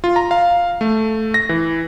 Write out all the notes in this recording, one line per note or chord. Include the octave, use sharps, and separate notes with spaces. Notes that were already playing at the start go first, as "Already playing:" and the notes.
F4
A#5
F5
A3
A#6
E3